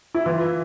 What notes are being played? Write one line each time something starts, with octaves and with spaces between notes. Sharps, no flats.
E4
E3 F4